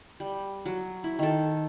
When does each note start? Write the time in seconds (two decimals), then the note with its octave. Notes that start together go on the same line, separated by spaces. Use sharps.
0.20 G3
0.66 F#3
1.04 E4
1.19 D#3 A4